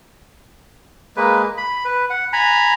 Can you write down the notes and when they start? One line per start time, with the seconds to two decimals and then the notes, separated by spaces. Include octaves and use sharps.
1.17 G#3 A#3 B4
1.57 B5
1.85 B4
2.10 F#5
2.33 G#5 A#5 B5